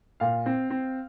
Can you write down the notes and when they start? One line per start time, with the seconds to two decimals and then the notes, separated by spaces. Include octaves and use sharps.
0.20 A#2 F5
0.46 C4
0.70 C4